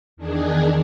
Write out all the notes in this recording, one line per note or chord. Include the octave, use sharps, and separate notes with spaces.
E2 D#3 D4 G#4